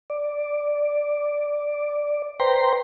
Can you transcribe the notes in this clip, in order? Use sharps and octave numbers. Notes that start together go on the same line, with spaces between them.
D5
B4 C5 G5 A#5 C6